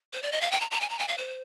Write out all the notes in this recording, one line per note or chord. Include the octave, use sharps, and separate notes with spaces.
C5
D5
D#5
F5
G5
A#5
A#5
G#5
A#5
G#5
F5
C5